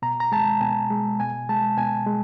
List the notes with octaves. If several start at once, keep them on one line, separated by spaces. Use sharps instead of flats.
B2 A#5
A#5
G#3 A5
B2 G#5
G#3
B2 G#5
G#3 A5
B2 G#5
G#3